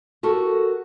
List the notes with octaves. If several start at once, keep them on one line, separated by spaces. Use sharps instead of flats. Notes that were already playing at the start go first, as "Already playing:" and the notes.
F#4 G4 A4 A#4